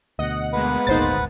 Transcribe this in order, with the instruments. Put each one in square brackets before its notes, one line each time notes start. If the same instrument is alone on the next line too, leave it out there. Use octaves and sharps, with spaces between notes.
[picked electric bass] D2 B2 [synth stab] D#5 [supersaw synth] F#5
[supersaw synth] G#3 A#3 B3 [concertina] B4 F#5
[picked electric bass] D#1 G#1 D2 [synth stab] D#4 C5 A6